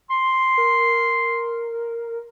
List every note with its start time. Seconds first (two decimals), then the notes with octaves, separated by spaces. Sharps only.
0.10 C6
0.57 A#4